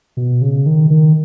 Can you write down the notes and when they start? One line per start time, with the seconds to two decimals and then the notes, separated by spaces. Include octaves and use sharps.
0.17 B2
0.41 C#3
0.66 D#3
0.90 D#3